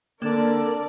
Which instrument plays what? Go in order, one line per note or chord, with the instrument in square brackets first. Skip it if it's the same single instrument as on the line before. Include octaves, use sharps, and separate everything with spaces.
[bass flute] D3 [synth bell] A#3 E7 [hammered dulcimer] C4 D4 [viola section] A#4 D5